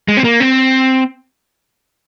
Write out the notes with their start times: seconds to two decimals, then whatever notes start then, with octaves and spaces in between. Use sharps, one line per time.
0.08 G#3
0.17 C4
0.24 A#3
0.40 C4